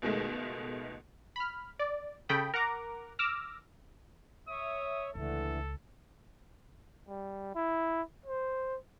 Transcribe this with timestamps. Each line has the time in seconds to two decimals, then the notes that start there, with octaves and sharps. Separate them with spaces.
0.02 C#2 B2 D#3 G#3 A3
1.36 B5 F6
1.79 D5
2.29 C#3 A4 G5 B5 D#6
2.54 A#4 F#5 A#5 D6
3.19 D6 E6 F6 A#6
4.49 C#5 E5 D#6
5.15 C#2 D3 E3 A3 A4
7.08 G3
7.55 E4
8.26 C5